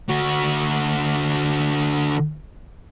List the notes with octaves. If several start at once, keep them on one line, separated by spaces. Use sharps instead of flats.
D3 F#4